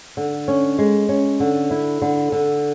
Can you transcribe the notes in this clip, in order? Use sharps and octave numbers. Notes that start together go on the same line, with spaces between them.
D3
C#4
G#3
C#4
D3
E4
D3
D3